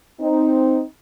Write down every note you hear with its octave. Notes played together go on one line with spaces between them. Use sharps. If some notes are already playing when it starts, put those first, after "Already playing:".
C4 D#4